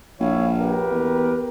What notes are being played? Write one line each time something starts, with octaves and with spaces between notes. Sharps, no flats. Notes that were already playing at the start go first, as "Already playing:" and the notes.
A#1 E4 C#5 F5
G4 A#4 B4
E2